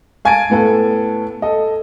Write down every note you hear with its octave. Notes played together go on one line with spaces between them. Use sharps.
F5 G#5 A5 G#6 A6 D7
A2 B3 A4
A4 D#5